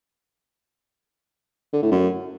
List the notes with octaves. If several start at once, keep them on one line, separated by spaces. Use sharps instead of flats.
D3
A2
F#2